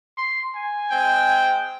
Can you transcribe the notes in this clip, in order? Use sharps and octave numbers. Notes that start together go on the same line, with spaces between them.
C6
G#5
G#3 C4 G5